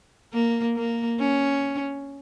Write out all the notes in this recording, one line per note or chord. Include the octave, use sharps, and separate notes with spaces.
A#3
A#3
C#4